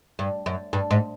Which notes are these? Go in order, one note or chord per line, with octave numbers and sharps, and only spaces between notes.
G2
F#2
G2
G#2